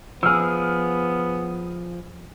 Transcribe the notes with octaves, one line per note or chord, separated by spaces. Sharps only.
F3 B3 G#4 E6 F6